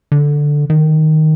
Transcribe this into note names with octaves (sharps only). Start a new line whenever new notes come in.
D3
D#3